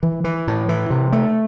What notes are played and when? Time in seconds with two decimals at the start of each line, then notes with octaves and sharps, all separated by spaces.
0.03 E3
0.24 E3
0.47 A2
0.69 E3
0.90 C3
1.13 A3